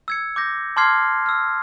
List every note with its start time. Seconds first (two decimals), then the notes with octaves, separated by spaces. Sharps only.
0.08 E6 G#6 C#7
0.36 D6 G6 A#6
0.76 A5 C6 D6 F6 G#6 C7
1.26 E6 F6